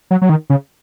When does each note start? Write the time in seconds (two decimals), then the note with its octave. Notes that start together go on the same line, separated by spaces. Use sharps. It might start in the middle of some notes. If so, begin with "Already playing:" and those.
0.11 F#3
0.22 F#3
0.29 D#3
0.50 C#3